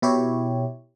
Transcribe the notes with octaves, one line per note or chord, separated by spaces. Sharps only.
B2 E4 G4 C#5